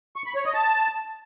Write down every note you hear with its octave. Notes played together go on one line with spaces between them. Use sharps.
C#6
B5
C#5
D#5
A5